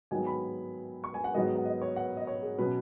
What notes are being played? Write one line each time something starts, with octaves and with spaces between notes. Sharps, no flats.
G#2 D#3 F#3 B3 G#5
B5
C#6
G#5
F#5
G#2 D#3 F#3 B3 D#5
F#5
D#5
C#5
F#5
D#5
C#5
G#4
B2 F#3 C#4 B4